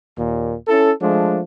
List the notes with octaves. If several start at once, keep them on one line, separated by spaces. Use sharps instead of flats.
D#2 A#2
C#4 E4 A4
F3 G#3 A3 D4